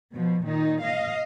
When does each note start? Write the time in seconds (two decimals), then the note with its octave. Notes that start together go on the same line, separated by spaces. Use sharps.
0.14 B2 F3
0.46 A#2 D#3 D#4
0.84 D#5 F5